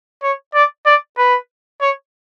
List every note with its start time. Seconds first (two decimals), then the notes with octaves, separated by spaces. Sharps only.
0.23 C#5
0.54 D5
0.86 D5
1.18 B4
1.81 C#5